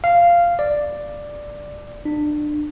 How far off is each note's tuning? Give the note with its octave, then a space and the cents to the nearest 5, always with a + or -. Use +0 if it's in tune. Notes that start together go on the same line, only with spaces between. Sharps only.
F5 -10
D5 +5
D4 +25